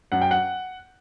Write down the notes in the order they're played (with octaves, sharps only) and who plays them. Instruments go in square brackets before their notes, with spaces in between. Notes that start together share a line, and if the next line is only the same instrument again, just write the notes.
[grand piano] F#2 F#5
G5
F#5